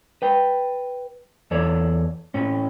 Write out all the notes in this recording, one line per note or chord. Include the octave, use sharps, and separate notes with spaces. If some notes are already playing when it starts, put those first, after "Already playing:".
B4 G5
E2 A4 C#5 D5
A2 C4 C#4